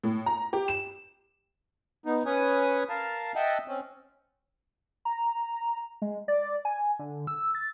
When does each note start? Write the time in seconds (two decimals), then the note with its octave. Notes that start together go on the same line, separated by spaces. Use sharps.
0.04 A2
0.26 A#5
0.53 G4
0.68 E7
2.06 B3 D#4
2.26 C#4 B4 C#5 G#5 D#6
2.89 A#4 F5 A5
3.35 D#5 E5 F#5 G5 A5
3.68 C4 C#4
5.05 A#5
6.02 G#3
6.28 D5
6.65 G#5
6.99 D3
7.27 E6
7.55 A6